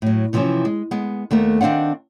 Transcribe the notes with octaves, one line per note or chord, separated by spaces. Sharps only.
A2 F#3
C3 E3 F3 G#3 C4 C#4
G#3
G#3 B3
D#2 A3 B3 A#4
D#3 C4 D4 F5 F#5